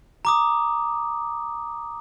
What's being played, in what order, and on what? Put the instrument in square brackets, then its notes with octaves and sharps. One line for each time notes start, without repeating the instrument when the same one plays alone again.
[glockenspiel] A#5 D6 D#6